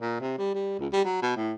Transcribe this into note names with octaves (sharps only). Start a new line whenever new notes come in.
A#2
C3
G3
G3
C#2
G3
F#3
B2
A2